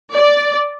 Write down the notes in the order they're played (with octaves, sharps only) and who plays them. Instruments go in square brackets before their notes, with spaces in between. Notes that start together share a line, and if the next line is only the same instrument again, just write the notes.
[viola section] D5